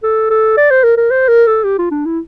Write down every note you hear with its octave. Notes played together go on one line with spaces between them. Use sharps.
A4
A4
D5
C5
A#4
A#4
C5
A#4
A4
G4
F4
D4
E4